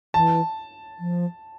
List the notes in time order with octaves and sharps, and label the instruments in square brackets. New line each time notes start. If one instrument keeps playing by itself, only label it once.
[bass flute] E3 [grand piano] A5
[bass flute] F3